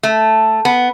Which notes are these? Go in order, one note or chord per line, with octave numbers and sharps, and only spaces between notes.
A3
B3